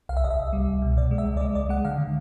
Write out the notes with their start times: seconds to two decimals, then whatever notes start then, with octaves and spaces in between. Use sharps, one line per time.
0.09 C2 F5
0.17 E5
0.24 C2 D#5
0.31 E5
0.39 C2
0.53 G3
0.67 C2
0.82 B2
0.97 B2 D5
1.11 G#3
1.18 E5
1.25 C#2
1.37 D5
1.40 G#3 D#5
1.55 C#2 D5
1.69 G#3 F#5
1.85 D3 F5
1.98 D3